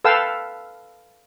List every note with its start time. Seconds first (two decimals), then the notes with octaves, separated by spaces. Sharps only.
0.04 A4 B4 F5 G5 E6